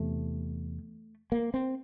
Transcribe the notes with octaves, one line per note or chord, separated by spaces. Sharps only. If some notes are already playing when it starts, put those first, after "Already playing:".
Already playing: E2 C3 A3
A#3
C4